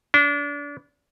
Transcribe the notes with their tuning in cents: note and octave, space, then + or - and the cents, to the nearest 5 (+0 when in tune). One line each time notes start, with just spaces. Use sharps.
D4 -30